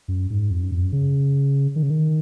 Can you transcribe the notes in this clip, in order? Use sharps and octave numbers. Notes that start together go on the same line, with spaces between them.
F#2
G#2
F2
F#2
F2
F#2
C#3
D#3
C#3
D#3